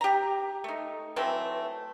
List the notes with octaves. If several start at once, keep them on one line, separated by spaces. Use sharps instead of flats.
G4 A#5
A3 D#4
E3 F#3 A3 C4